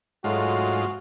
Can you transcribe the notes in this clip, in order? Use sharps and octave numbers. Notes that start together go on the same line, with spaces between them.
G#2 F#3 G#3 A3 F4 F#4